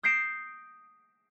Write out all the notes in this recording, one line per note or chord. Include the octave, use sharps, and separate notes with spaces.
D#6 G6 A#6 C7 D7 E7